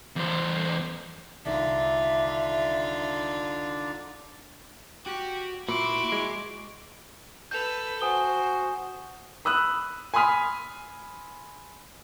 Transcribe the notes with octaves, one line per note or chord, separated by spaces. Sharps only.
E2 C5
C2 D3 D#3 D4 D#4 F4 D5 E5
F#4 G4
A#2 E4 F#4 C6 D6
G#3
A4 B4 G6 F7
F#4 C5 G#5 D#6 G7
B5 D#6 E6 F#6
G#5 B5 C6 D#6 F6 B6